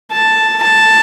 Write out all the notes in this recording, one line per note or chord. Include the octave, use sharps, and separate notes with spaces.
A5
A5